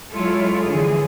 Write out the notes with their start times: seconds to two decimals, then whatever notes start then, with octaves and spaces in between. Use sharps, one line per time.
0.10 F#3 G#3 E4 F4 A4 C#5
0.65 D3 E3 F3 G#4